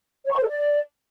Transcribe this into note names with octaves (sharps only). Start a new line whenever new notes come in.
C#5
C#6
C5
A4
D5